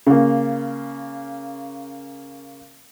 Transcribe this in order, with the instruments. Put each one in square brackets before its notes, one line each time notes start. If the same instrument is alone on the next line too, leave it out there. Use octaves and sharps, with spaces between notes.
[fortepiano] C#3 A#3